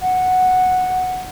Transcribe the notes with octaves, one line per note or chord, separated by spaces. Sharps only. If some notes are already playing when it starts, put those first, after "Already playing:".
F#5